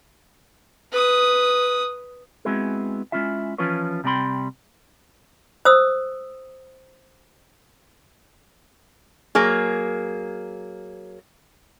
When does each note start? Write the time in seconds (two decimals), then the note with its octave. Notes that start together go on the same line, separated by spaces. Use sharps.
0.92 B4 D#6
2.45 G#3 B3 C4 E4 F#4 G#4
3.12 G#3 A3 C#4 E4 F4 E5
3.58 E3 F3 C#4 F4 B4 C#5
4.04 C3 G3 C4 G5 B5 C6
5.65 C5 D#6 E6
9.35 F#3 A#3 G#4